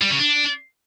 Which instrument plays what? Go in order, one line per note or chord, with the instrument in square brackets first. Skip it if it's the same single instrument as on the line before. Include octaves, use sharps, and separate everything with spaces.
[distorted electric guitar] G3
C#3
D4